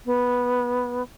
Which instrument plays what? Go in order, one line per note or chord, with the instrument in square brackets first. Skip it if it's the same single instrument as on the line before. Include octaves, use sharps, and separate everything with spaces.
[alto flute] B3